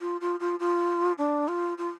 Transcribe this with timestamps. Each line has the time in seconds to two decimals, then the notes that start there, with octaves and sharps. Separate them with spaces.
0.01 F4
0.21 F4
0.40 F4
0.60 F4
1.18 D4
1.48 F4
1.78 F4